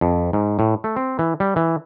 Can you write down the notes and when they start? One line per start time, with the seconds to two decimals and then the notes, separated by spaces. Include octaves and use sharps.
0.01 F2
0.33 G#2
0.59 A2
0.84 A3
0.96 C4
1.19 E3
1.40 G3
1.56 E3